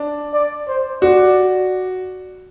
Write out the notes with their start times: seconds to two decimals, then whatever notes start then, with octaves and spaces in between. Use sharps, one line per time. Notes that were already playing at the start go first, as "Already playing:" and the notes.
Already playing: D4
0.33 D5
0.68 C5
1.01 F#4 D5